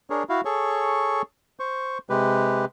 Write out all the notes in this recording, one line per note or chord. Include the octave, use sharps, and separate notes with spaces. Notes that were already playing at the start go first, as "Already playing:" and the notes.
D4 G#4 A#4 C#5
E4 F#4 F5
G#4 A4 C#5 C#6
C5 C#6
C3 G#3 G4 B4